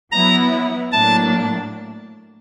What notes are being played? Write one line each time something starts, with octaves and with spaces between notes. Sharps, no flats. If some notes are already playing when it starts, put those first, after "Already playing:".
F#3 B3 E4 A#5
A2 F#3 A#3 D4 A5